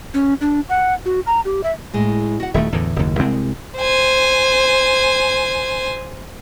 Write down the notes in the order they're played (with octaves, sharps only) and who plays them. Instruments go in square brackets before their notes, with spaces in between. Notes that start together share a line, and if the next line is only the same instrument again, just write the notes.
[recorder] C#4
D4
F#5
F#4
A#5
G4
E5
[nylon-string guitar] A2 G#3
F#4 F#5
[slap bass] D#1 D#3 A3 [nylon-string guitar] E5
[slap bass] E2 A2 D3
F#1 D#2
C2 G#3 C4
[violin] C5 G#5